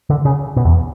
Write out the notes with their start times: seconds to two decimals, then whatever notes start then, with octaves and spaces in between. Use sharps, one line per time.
0.10 D3
0.25 C#3
0.56 B2
0.65 E2